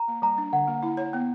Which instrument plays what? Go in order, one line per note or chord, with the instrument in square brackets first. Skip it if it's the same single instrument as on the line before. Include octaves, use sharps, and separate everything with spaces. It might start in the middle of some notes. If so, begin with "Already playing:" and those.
Already playing: [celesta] A#5
[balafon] A#3
[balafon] G3 [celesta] A#5
[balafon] D4
[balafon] D3 [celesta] F#5
[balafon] A#3
E4
C#5
B3